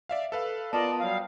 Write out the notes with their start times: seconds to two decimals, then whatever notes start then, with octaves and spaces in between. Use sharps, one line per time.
0.09 D5 E5 F5
0.32 A4 B4 F5
0.73 B3 F4 A#4 D5 D#5 A5
1.00 F#3 G3 F5 D#6